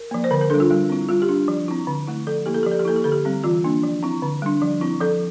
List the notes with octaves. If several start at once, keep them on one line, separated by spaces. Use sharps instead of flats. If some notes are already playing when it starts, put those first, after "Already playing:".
Already playing: A#4
F3 A#3
C5
D3 A#4
A#4
G3 D4 A4
F4
G3
C4 E4
G3 F4
G4
D4
F3
C4 E4
D3
A3 E4
F3 A4
A#3 E4 G4
A4
G4
F3 A4
G4
A#3 E4 A4
G4
D3 A4
G4
G3 C4
E3 F4
A#3 D4
F3
C4 E4
D3
G3 D4
F3
C4 E4
F3 A4